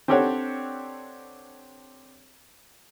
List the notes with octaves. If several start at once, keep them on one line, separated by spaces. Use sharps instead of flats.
C4 D4 G4 A4 C#5 F#5